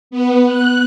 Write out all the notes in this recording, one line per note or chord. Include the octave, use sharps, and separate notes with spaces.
B3
F#6